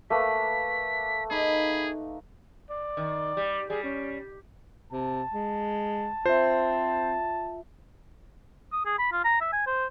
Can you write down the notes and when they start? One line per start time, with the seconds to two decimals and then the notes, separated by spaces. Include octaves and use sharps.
0.10 A3 A#3 B4 B6
1.31 D#4 G#4 B5
2.70 D5
2.97 D#3
3.37 G3
3.70 G3 G#4
3.84 C#4
4.92 C3 A5
5.34 G#3
6.26 C4 F4 C5 E5
8.73 D#6
8.85 G#4
8.99 B5
9.12 F4
9.24 A#5
9.41 E5
9.53 G#5
9.67 C5